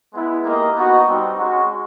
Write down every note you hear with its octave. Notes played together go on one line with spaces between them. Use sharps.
G#3 B3 E4
A#3 D#4 G4 A#4 D#5
B3 D#4 F#4
G3 C4 D#4
G#3 C#4 F#4